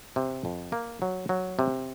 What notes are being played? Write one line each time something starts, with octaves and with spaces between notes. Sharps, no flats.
C3
F2
A#3
F#3
F#3
C3